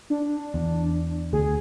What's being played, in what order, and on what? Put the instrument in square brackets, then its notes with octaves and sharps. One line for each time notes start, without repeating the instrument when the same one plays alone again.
[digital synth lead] D4
[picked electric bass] E2
[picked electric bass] D2 [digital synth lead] G#4